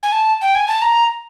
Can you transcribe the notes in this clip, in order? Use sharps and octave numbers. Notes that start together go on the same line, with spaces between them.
G#5
A5
G5
G#5
A5
A#5